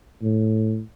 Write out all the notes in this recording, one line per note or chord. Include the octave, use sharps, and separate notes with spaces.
A2